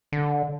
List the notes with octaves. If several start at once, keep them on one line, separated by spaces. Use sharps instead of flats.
D3